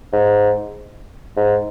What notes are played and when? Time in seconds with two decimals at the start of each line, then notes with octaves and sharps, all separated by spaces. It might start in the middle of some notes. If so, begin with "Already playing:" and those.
0.13 G#2
1.37 G#2